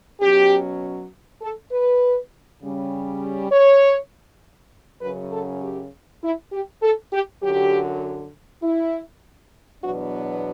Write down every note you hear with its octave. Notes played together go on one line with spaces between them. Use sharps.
B2 F#3 C#4 G4
A4
B4
C#3 G3 C#4
C#5
F#2 C#3 F#3 C#4 B4
A4
G4
E4
G4
A4
G4
F#2 D3 F#3 G4
E4
E2 B2 F#3 B3 D4 F#4